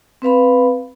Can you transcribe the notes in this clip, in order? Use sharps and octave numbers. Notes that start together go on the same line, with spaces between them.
C4 B4 F5 B5